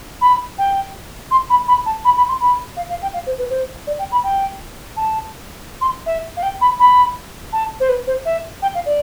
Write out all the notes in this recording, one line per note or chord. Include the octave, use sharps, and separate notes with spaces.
B5
G5
C6
B5
B5
A5
B5
B5
C6
B5
F5
F5
G5
F5
C5
B4
C5
D5
G5
B5
G5
A5
C6
E5
F5
G5
B5
B5
A5
C5
B4
C5
E5
G5
F5
D5